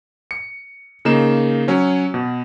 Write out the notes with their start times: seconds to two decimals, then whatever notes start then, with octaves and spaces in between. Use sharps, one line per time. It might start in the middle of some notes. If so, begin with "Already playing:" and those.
0.31 C#7
1.05 C#3 A#3 D#4 E7
1.68 F#3 C#4 C#5
2.14 B2